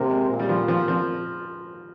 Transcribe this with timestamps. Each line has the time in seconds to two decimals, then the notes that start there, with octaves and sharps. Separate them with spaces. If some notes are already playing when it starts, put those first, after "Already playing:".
Already playing: C3 A#3 C4
0.10 G#3
0.29 A#2
0.39 G3
0.49 F3
0.68 F3
0.88 F3